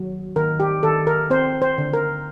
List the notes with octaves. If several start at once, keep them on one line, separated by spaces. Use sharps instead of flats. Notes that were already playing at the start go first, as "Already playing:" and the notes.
Already playing: D#3 F#3
D#3 A#4
G4
D#3 A4
A#4
C4 C5
C5
D3
A#4